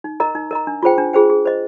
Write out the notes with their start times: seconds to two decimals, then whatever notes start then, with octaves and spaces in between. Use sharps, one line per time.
0.04 D#4
0.20 A#4 D#5 A#5
0.35 D#4
0.51 A#4 D#5 A#5
0.67 D4
0.83 F4 G#4 C5 G5
0.98 D4
1.13 F4 G#4 C5 G5
1.30 G#4
1.45 C5 D#5